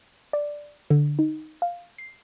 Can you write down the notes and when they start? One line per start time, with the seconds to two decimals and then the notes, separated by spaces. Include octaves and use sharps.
0.33 D5
0.90 D3
1.19 D#4
1.62 F5
1.98 C7